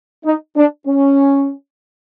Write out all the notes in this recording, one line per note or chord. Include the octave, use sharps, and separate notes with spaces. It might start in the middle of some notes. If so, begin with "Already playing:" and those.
D#4
D4
C#4